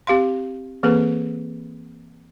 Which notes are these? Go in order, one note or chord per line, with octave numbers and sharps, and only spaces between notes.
C4 G4 F5 C6
E3 A#3 C4 G#4 A4 B4